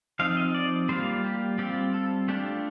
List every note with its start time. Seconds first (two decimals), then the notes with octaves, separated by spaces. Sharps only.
0.19 F3 C4 D#4 F5
0.37 D#5
0.54 D5
0.89 G3 A#3 F4 C5
1.24 G4
1.58 G3 C4 F4 G4
1.94 A4
2.28 A3 D4 F4 G4